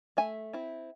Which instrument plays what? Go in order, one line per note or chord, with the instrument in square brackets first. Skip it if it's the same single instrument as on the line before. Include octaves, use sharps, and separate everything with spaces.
[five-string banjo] A3 E5 G#5
C4 E4